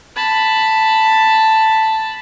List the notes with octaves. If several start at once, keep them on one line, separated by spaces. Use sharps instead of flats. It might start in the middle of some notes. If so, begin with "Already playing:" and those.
A5 B5